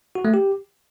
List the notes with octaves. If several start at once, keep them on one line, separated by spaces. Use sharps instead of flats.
F#4
A3
G4